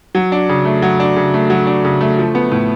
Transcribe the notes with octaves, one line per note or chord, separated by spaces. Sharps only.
F#3
D4
C#3
A3
F#3
D4
C#3
A3
F#3
D4
C#3
A3
F3
B3
A2